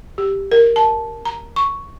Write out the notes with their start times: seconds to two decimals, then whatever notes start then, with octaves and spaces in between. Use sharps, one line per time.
0.18 G4
0.52 A#4
0.76 A5
1.25 A#5
1.56 C#6